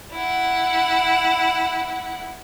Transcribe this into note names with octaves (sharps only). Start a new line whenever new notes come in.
E4 F#5